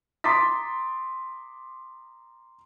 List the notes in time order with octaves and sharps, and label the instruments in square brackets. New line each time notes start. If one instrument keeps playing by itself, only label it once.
[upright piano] A#5 C6 D6 D#6 A6 B6